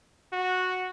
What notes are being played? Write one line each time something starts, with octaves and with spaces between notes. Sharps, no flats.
F#4